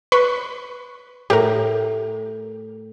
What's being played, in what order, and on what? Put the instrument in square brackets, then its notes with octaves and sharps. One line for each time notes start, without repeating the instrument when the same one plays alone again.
[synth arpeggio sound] B4 B5 C#6
[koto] A2 [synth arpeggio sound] G4 A#4